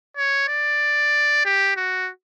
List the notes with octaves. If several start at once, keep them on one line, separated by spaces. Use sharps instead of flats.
C#5
D5
G4
F#4